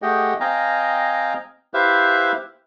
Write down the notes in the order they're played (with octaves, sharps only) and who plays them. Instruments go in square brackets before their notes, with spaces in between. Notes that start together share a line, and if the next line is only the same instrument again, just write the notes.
[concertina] A3 G4 G#4 D#5 F#5 G5
C4 D#5 F5 G5 G#5 A#5
E4 G4 B4 C5 E5 F5